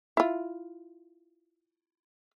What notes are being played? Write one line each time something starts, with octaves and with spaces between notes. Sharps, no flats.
E4 F4